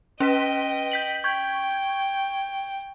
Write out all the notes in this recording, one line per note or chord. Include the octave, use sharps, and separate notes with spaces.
C#4 B4 D#5 G5 B6
G6 B6 F#7
G5 C#6 G6 G#6